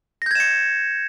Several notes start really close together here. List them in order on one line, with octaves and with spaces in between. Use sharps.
A#6 G6 G#6 E7 C#7